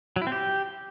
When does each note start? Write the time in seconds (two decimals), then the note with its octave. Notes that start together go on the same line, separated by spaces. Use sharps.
0.16 F#3
0.22 E4
0.27 C4
0.32 G4